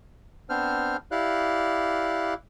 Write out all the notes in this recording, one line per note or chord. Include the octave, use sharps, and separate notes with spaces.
B3 C4 D4 C5 F6
E4 G4 D5 F5 F#6